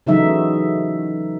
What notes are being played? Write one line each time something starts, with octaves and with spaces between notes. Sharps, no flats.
C#3 E3 F#3 A3 D#4 E5